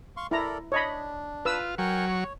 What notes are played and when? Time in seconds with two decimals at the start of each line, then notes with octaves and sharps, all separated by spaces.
0.17 F5 C6 C#6
0.31 E4 A4 A#4 D5 A#5
0.72 D4 C#5 D#5 B5
1.45 F4 B4 E6
1.78 F#3 A#4 G5 G#5 C#6
2.07 C#5